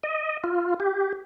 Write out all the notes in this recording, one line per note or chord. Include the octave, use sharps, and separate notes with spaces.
D#5
F4
G4